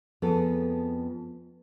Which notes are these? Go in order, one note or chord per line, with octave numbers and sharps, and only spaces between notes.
F2 B3 G#4 A4